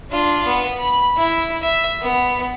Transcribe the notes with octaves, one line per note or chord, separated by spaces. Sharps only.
D4 F4
B3
B5
E4
E5
B3